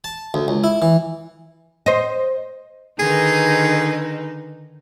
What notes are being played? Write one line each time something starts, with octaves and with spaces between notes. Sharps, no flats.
A5
D2
C#2
E4
E3
C5 D#5
D3 D#3 D#4 G#4 B4